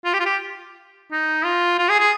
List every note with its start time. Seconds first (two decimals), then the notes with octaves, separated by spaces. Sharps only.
0.05 F4
0.14 G4
0.20 F4
0.26 G4
1.12 D#4
1.45 F4
1.79 F4
1.89 G#4
2.00 G#4